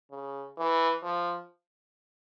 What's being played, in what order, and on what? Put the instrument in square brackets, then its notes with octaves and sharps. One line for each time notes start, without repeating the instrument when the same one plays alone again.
[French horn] C#3
E3
F3